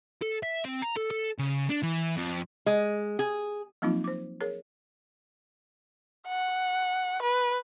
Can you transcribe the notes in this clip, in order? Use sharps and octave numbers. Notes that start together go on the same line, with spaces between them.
A4
E5
C4
A#5
A4
A4
C#3
D4
E3
F2
G#3
G#4
F3 F#3 A#3 C4 D#4 F4
C5 D6
G#4 A#4 C#5
F#5
B4